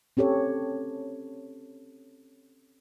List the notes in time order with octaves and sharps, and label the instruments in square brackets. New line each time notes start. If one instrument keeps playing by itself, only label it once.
[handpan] C4 C#4 G4 A4 C#5